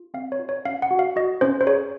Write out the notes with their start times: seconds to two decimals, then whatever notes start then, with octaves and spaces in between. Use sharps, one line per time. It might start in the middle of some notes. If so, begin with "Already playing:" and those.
Already playing: F4
0.14 C4 F5
0.32 C#5
0.39 F4
0.49 C#5
0.65 C#4 F5
0.82 F#5
0.91 F#4
0.99 F5
1.16 F#4 D#5
1.41 C#4 C5
1.61 C5
1.67 G#4 C#5